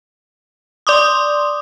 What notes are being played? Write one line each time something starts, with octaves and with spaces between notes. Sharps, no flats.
D5 C6 D6 D#6